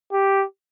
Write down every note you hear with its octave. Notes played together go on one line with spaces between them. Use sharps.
G4